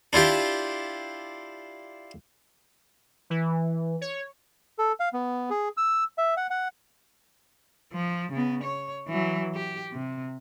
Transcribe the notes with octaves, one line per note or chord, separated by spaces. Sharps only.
D4 E4 F4 G4
E3
C#5
A4
F5
B3
G#4
E6
E5
F#5
F#5
F3
C#3 B3
C#5
E3 F#3
G4
C3